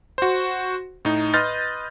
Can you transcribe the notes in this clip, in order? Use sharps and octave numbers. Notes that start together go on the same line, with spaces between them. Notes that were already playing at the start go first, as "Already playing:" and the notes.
F#4 C5
A2 D#4
B4 D#5 C6 F6 G6 A6